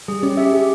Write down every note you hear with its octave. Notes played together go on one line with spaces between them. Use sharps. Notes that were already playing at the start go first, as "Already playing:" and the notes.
G3 G#4
C#4 G4
G4 E5
G#4